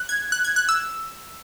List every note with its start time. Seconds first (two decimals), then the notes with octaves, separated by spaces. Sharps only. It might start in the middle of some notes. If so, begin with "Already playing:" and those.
Already playing: F#6
0.09 G#6
0.32 F#6
0.44 G#6
0.56 F#6
0.69 E6